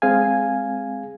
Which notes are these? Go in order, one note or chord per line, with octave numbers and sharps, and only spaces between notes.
G#3 C4 G#4 F5 G#5